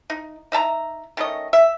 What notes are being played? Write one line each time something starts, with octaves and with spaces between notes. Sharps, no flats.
D#4
D#4 E5 A5 A#5
D#3 A3 C#4 D#5
E5